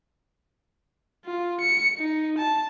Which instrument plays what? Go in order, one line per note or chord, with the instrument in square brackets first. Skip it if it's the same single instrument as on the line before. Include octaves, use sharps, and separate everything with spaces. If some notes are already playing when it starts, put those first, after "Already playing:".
[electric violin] F4
C#7
D#4
A5